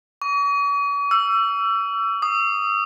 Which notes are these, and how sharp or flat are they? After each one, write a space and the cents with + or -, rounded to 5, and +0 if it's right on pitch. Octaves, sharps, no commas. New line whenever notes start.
C#6 +45
E6 +30
D#6 -10